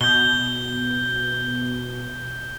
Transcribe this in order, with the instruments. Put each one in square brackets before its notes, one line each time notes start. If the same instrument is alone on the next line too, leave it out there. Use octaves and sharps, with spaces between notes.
[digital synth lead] B2 [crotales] G6 G7